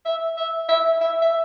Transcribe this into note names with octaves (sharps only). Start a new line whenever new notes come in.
E5
E5
E5
E5
E5